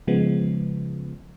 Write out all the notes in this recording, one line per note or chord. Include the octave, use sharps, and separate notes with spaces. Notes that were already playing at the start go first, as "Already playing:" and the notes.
C#3 F3 G#3 B3